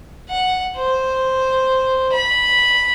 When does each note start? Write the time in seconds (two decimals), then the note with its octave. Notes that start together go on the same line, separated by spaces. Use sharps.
0.29 F#5
0.77 C5
2.13 B5